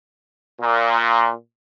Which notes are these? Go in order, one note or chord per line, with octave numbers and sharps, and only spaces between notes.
A#2